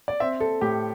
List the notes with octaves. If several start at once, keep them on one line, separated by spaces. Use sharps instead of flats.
D5
C4 E5
A4
A2 G4